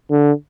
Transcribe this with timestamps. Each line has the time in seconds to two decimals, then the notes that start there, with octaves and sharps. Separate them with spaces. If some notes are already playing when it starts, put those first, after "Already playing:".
0.11 D3